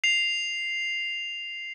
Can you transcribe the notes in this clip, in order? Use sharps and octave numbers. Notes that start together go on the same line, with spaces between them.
C7 F7